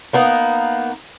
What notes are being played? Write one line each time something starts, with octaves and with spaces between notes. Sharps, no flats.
A#3 B3 D#4